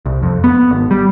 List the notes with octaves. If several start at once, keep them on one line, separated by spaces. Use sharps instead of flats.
C2
F2
B3
G#1
G3